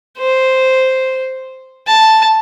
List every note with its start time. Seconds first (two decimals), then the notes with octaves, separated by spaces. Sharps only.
0.18 C5
1.87 A5